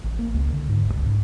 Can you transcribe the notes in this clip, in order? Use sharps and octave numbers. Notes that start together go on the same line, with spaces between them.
A1
A#3
C#2
D3
G#2
D1
C#2
G#2